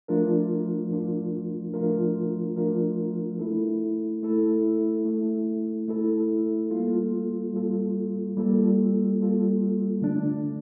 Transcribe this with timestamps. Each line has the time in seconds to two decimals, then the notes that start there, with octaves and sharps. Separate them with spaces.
0.08 F3 A3 D4 F4 A#4
0.91 F3 A3 D4 F4 A#4
1.74 F3 A3 D4 F4 A#4
2.56 F3 A3 D4 F4 A#4
3.39 A3 E4 A4
4.23 A3 E4 A4
5.05 A3 E4 A4
5.88 A3 E4 A4
6.71 G3 A#3 F4 A4
7.53 G3 A#3 F4 A4
8.37 G3 A#3 F4 A4
9.19 G3 A#3 F4 A4
10.02 D3 A3 D4